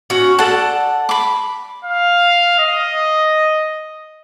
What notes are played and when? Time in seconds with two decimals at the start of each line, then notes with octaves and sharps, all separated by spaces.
0.10 C#4 F#4
0.39 A4 D5 F#5 A5
1.09 B5 D6
1.85 F5
2.59 D#5